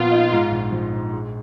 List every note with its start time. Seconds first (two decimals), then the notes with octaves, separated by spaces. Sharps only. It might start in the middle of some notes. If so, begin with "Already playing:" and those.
Already playing: A#2 F3 B3 F4
0.11 D#4
0.32 G#2
0.52 A#1
0.72 F3
0.94 A#1
1.13 G#3